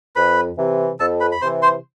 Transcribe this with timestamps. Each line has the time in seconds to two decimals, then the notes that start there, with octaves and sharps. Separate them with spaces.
0.16 F2 B4 B5
0.57 C3 E3
1.00 F2 A4 A5
1.20 B4 B5
1.32 B5
1.41 C3 C5 C6
1.45 E3
1.62 C5 C6